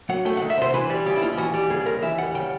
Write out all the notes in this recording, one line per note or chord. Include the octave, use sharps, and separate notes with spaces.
F#3 F#5
A3 G5
F#5
D#3
E5
C3 C5
E3 B4
G3
C#3 G4
E4
D#2 F4
E3 F#4
G3 G4
C#3 G#4
D#2 A#4
E3 E5
G3 F#5
C#3 G5